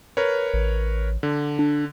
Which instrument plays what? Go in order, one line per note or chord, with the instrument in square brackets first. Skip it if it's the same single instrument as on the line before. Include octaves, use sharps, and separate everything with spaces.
[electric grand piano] A#4 B4 C#5
[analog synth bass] A1
[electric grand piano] D3
[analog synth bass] D4